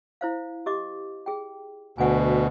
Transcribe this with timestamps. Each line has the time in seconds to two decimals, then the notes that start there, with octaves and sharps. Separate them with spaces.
0.21 E4 C5 F5
0.66 G4 D#5 D6
1.26 G#4 G5
1.98 D2 B2 F#5 G#5